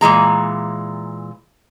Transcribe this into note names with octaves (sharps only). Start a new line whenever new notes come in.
A#2 E3 G#3 A#5